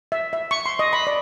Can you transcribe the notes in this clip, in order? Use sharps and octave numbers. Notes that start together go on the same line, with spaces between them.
E5
E5
C#6
C6
D#5
B5
D5